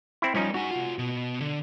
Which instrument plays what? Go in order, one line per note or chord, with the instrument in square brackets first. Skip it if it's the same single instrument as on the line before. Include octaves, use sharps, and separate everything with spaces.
[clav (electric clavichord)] C4 E4
[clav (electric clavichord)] F3 C#4 D#4 [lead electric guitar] G3
[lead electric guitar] D#4 G#5 [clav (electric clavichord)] F#4
[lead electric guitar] C3 F4
B2
D3